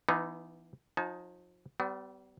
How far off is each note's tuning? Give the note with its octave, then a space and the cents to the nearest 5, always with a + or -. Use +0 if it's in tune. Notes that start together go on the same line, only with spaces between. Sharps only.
E3 +20 B3 +0 D#4 -10
F3 +35 D#4 +0 A5 -45
G3 -30 B3 +30